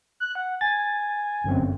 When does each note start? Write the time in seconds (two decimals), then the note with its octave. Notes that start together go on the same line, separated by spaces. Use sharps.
0.20 F#6
0.35 F#5
0.61 G#5 A6
1.44 G1 F#2 C4